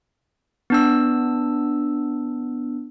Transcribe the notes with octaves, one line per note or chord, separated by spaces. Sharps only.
B3 D4 E6